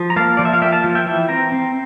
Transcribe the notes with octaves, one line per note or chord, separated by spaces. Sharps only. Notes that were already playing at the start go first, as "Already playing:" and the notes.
Already playing: F3
A#5
A#3 F5 A5
F3 D5
E5
F5
A#3 E5 G5
F5 A5
F3
E5 G5
E3 E5 G5
C4 G5 A#5
C4